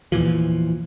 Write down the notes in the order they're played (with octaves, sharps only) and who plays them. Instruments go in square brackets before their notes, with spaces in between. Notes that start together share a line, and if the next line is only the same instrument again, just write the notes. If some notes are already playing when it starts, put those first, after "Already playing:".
[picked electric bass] E2 A#2 E3 F3